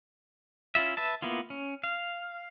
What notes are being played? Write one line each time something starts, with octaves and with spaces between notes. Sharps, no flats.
C#4 E4 F4 E5
B4 E5 A5
A#3 B3 E4 F4
C#4
F5